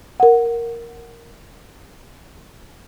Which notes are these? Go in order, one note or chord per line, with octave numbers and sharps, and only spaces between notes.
A#4 F#5